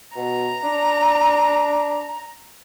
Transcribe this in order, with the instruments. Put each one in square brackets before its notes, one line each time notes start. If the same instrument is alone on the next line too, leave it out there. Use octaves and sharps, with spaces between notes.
[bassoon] B2 [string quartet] A#5
[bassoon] D4